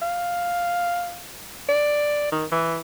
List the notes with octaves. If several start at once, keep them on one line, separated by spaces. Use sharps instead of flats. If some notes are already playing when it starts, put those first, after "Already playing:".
F5
D5
D#3
E3